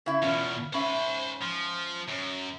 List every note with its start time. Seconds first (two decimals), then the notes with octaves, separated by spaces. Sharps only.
0.06 C#3 E4
0.22 E2 B2 C#4 F4
0.73 G#2 C#4 C5 E5 B5
1.41 F3
2.08 F#2